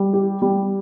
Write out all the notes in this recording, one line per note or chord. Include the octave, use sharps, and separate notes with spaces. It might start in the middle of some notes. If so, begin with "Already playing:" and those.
Already playing: G3
G4
G3